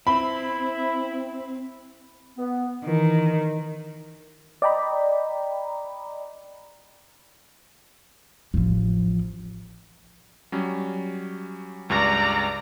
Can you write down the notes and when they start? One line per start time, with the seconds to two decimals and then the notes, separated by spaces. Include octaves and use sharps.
0.07 C4 E4 B5
2.37 B3
2.85 D#3 E3
4.62 D5 D#5 G5 A#5 B5
8.54 A1 F3
10.52 F#3 G3 C#4
11.90 C#2 G2 D4 D5 A#5